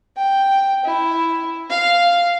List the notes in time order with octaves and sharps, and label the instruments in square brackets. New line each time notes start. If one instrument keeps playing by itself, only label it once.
[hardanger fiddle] G5
E4
F5